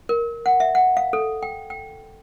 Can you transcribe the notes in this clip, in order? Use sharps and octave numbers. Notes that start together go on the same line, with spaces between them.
A#4
F#5
E5
F#5
F5
A4
G5
G5